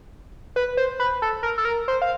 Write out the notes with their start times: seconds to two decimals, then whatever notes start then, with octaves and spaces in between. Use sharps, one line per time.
0.56 B4
0.77 C5
1.00 B4
1.22 A4
1.43 A#4
1.58 A4
1.65 A#4
1.88 C5
2.02 F5